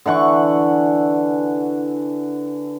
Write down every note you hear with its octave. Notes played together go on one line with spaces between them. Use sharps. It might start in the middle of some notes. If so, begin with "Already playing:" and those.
D3 E3 F#5 C#6